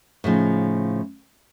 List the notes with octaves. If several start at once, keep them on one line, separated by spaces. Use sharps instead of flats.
A2 C#3 F3 D#4